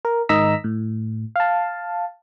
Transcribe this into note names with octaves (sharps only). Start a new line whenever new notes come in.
A#4
G#2 D#3 D#5 A#5 E6 B6
A2
F5 A5